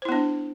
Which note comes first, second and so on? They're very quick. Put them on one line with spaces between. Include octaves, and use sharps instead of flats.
C5 E4 B3 D4